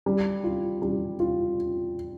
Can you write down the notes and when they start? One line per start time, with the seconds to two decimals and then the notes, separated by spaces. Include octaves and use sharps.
0.06 G3
0.44 F4
0.82 G3
1.20 F4